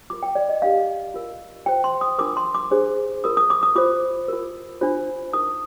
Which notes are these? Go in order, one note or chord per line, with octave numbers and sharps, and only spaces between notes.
F4 A#4 D6
G5
D5
D#5
D4 G4 A#4 F5
F4 A#4
F4 C5 G5
C6
D#6
D4 F4 A#4 D6
C6
D6
D4 G#4 C5
F4 A#4 D#6
D#6
D6
D#6
F4 C5 D6
F4 A#4
D4 F4 C5
D#4 A#4 D#6